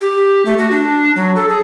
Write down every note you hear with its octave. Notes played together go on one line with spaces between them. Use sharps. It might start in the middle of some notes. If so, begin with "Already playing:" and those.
G4
A3
F#4
D4
F#3
A4
G#4